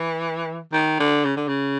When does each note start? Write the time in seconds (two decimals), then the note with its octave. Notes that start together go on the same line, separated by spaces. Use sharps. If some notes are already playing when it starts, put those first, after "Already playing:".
Already playing: E3
0.72 D#3
0.99 D3
1.24 C#3
1.37 D3
1.48 C#3